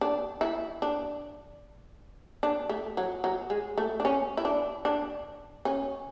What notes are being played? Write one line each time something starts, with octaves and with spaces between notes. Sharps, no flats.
D4
E4
D4
D4
A3
F#3
F#3
G#3
A3
D4
C#4
E4
D4
D4
C#4